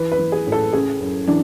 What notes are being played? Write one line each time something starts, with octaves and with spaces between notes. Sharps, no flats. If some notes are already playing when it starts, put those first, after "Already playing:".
Already playing: E3 B4
B4
E3
G#4
A2
A4
C#3 G#4
F#2
E3 D4